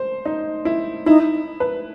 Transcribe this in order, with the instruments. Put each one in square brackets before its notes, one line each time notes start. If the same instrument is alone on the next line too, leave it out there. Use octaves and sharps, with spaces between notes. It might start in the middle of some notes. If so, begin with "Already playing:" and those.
Already playing: [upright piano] C5
D#4
E4
[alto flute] D#4 [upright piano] E4
[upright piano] B4